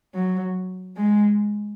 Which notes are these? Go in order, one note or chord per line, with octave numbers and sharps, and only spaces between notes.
F#3
G#3